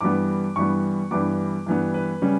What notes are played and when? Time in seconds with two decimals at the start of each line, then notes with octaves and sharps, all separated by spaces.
0.01 G2 E3 G3 B3 D6
0.56 G2 E3 G3 B3 C#6
1.11 G2 E3 G3 B3 D6
1.66 G2 E3 G3 B3
1.94 B4
2.22 C#3 G3 C#4